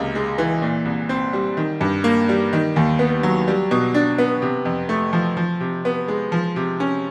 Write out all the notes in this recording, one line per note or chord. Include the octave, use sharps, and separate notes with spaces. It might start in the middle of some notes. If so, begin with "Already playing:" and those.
Already playing: C#2 C3 A#3
G#3
E3
A#2
C2
C4
G3
D#3
G2
A#3
G3
D#3
D#2
B3
F#3
G3
B2
D4
B3
C3
F2
A3
F3
F3
C3
B3
G#3
F3
C3
C#4